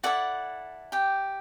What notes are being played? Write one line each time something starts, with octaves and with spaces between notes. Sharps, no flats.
E4 F#4 A4 D5 F#5
G4 G5